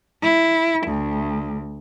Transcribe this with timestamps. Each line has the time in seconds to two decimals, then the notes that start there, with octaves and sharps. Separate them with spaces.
0.23 E4
0.87 D2